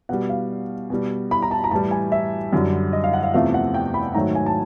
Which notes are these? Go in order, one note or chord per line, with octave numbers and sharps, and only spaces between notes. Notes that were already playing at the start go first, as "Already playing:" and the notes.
B2 G3 F#5
F5
B2 G3
B5
A#5
A5
A#5
A2 E3 G3 A5
G#5
E5
F#2 D3 G3
D#5
F5
F#5
F5
E2 C3 F3 A3 F5
F#5
G5
B5
G#2 D#3 F#3 A3 A#5
G#5
A5